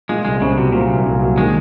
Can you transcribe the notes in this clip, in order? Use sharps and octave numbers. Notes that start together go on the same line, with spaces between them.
A#2 G#3
C2 G#3
C#3 C4
C3 F#3
A#2 C4
C2
C2
F#3
D#3 G#3